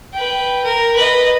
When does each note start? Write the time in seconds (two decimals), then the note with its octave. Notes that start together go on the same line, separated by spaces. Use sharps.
0.13 B4 G5
0.64 A#4
0.95 B4 D#5